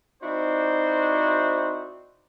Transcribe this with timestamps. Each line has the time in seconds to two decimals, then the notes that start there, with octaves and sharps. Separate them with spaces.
0.22 C4 D#4 E4 F#4 C5 D5